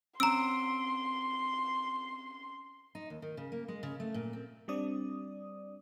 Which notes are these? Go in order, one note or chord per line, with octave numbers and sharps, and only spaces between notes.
C4 C#4 A#5 C6 E6 D7
D#4
D#2
D#3
C#3
A#3
G#3
C#3
A3
A#2
C4
G3 C4 D4 D5 D#6